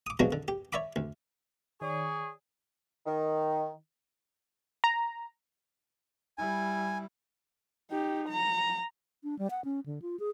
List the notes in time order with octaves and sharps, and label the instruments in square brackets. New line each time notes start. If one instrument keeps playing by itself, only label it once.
[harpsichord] D6 D#6
B2 F3 F#3 G#3 D4 F#4
D3
G4
C#5 D5 E5 B5 D6
D2
[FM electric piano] D#3 C#5 D5 [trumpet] G#4 [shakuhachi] C#6
[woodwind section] D#3
[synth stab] A#5
[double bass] G3 E4 [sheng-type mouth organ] G#5
[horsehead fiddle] D#4 G4
A#5
[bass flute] D4
G3
F#5
C#4
D3
F4
G#4